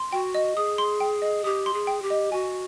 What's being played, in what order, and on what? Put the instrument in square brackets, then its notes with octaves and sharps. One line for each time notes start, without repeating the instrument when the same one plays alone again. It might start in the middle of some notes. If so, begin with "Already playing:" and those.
Already playing: [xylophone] C6
[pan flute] F#4 [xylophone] G5
[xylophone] D#5
[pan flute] G#4 [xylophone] D#6
[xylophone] C6
G5
D#5
[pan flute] G4 [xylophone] D#6
[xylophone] C6
[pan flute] G#4
[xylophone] G5
[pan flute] G4
[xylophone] D#5
[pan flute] F#4 [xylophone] G#5